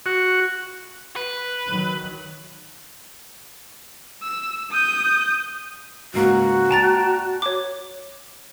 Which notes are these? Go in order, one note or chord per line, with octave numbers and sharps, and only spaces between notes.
F#4
B4
D#3 F#3
E6
D#6 G6
C#2 G#2 A#3 F#4
D5 G5 A5 A#5 A6
C#5 D6